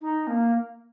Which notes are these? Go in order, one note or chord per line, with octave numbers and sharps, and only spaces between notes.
D#4
A#3